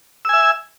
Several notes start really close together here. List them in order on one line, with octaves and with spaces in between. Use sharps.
E6 G#5 E5